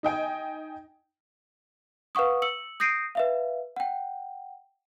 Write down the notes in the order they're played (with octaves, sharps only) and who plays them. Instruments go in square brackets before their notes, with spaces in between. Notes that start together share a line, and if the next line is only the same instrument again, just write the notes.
[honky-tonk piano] D#4 D#5 G5 G#5
[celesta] B4 F5 F#5 C#6 D#6
E6 C#7 F#7
D#6 G6 A#6 C7 D7 D#7
B4 E5 F5
F#5 G5